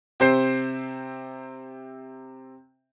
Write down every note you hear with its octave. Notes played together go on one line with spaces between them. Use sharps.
C3 C4 C5 G6 C7